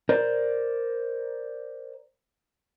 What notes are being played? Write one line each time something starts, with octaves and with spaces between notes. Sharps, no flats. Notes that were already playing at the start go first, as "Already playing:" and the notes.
A#4 C5 D5